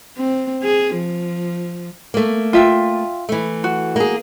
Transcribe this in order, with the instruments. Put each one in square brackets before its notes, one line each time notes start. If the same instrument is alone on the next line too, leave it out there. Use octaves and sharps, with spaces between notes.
[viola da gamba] C4
G#4
F3
[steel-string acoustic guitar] A3 A#3
[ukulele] F4 E5 G5
[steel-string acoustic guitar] E3 A3
[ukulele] F#4
[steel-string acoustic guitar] A#3 G#4